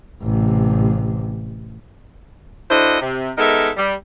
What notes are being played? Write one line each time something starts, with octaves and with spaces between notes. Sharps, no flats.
A1 C3
D3 D4 E4 F#4 C5 D#5
C3
G#3 B3 D#4 A4 A#4 E5
G3